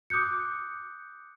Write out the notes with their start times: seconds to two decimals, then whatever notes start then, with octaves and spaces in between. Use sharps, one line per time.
0.10 D6 D#6 F#6 G6 C#7